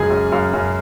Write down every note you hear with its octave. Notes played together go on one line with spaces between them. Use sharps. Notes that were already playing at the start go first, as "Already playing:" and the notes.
Already playing: C#2 F#2 G#4 G#5
F#2
F#2 F5
F#2